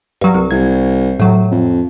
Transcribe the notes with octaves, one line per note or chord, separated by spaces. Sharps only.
G2 F#3
C2
C2 G#6
A2 F#3
F2